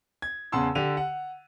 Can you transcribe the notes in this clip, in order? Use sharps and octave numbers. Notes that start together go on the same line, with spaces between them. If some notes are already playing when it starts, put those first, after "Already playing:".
G#6
E2 C#3 F#5 A5 C6 E6
D3 G4 D#7 F7
F#5